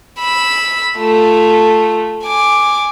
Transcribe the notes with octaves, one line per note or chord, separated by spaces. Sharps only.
B5 E6
A3 F4
G#5 D6